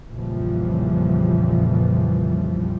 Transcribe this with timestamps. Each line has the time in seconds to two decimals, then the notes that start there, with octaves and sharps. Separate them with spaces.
0.12 A#1 F2 C#3 E3 F3 G3